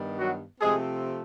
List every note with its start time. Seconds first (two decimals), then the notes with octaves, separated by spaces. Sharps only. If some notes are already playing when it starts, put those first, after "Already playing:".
Already playing: G2 D#3 G3 B3
0.18 F#3 F#4
0.61 C3 F3 G#3 A3 C4 G#4